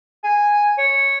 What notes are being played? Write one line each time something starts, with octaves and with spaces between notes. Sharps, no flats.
G#5
C#5